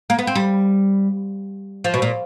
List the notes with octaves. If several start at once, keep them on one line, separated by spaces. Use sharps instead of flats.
A#3
B3
C4
G3
F3
B2
A#2